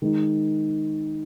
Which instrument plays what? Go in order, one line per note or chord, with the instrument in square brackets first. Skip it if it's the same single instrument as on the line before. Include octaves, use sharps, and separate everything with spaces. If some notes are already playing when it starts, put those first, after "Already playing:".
[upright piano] D#3 G#3 D#4